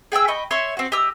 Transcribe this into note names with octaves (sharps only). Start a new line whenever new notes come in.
G#4 G5 G#5 E6
D#5 G5 B5 C#6
C#5 E5 C6 C#6
C4 F#4
G4 D#5 E6